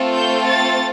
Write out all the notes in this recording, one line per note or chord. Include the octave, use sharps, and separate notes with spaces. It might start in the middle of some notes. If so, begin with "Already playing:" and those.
Already playing: A3 C4 F4 A4
G6
A6